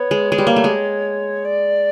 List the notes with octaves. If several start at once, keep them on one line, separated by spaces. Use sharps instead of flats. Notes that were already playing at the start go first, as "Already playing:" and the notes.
Already playing: B3 C#5
G#3
G#3
G3
A#3
A3
G#3
D5